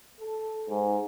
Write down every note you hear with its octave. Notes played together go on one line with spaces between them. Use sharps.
A4
G#2